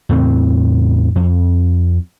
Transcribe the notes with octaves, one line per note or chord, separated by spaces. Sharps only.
E2 A2 C#3 C4
F2